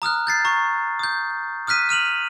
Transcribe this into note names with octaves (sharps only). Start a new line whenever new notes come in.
A#5 D#6 F6 F#6
G6 A6 C7
A#5 C#6
D#6 G6
D#6 F6 F#6 B6 D#7
F6 D#7 F7 F#7